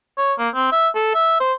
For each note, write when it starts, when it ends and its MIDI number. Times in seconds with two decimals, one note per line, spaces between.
0.18 0.33 73
0.39 0.49 58
0.55 0.71 60
0.72 0.88 76
0.95 1.14 69
1.15 1.36 76
1.40 1.53 72